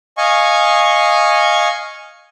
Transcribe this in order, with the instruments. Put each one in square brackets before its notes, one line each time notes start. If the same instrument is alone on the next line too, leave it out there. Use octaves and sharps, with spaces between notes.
[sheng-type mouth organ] D#5 F5 G#5 C#6